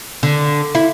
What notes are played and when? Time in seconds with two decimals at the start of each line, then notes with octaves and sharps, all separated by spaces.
0.23 D3
0.75 E4